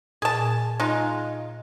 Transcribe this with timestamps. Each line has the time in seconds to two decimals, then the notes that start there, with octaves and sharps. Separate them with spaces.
0.22 A#2 G#4 A5
0.80 G#3 D#4 F4